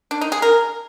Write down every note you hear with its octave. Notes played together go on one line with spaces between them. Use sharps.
D4
D#4
G#4
A#4